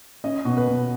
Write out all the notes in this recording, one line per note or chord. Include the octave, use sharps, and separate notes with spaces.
C#4 D#5
B2
B4
B2